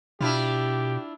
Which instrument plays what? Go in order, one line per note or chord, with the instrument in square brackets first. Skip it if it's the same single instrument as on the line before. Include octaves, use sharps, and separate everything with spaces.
[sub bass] B2 [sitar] D4 E4 F4 [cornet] G4